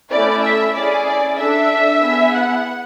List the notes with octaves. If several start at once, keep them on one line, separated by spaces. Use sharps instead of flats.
A3 C#4 E4 D5
E5
C#4 E4 G#4 D5
D5
D4 A4 E5
B3 E4 G#4
F#5